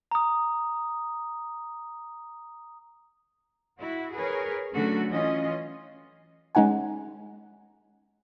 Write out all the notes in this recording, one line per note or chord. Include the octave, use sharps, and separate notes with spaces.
A#5 D#6
E4 F#4
G#4 A#4 B4 C#5
D3 F#3 A3 C#4 F#4
E3 C#4 F4 D#5
G#3 C#4 D#4 F#5 G#5